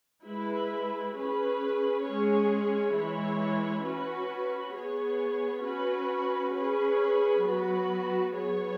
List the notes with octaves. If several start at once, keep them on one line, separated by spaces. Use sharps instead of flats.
G#3 E4 B4
C#4 G#4 B4
G#3 C#4 G#4 C#5
E3 G#3 E4 C#5
C#4 F#4 B4
B3 G#4 C#5
C#4 F#4 B4
C#4 G#4 B4
F#3 B3 F#4 B4
F#3 B3 G#4 C#5